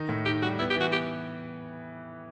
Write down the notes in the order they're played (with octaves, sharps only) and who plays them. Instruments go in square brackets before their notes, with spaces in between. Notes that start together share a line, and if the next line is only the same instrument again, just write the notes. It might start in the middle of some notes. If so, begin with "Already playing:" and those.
Already playing: [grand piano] D#3 D#4
A2
[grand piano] D#4 [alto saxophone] G4
[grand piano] G3 [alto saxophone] F#4
[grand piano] B3 [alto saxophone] E4
[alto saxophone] G4
[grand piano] E3
[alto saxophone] F#4
[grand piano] B3 [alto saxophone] G4